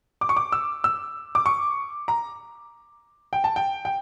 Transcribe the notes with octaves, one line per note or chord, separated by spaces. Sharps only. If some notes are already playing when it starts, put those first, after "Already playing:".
D6
C#6
D6
E6
E6
D6
C#6
A#5
G5
A5
G5
G5